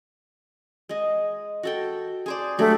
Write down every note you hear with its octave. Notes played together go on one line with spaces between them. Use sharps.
G#3 D#5
F#4 A4 G5
G#4 C5 D5
F#3 G3 A3 D4